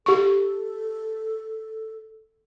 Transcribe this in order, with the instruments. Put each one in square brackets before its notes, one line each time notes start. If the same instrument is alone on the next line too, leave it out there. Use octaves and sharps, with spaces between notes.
[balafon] G4 C#6 [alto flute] A4